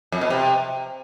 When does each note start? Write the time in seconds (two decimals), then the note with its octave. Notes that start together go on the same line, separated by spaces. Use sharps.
0.12 F2
0.21 B2
0.30 C3